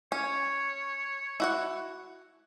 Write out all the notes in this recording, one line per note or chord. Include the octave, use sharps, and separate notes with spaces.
C#4 C#5
E4 F#4 F#5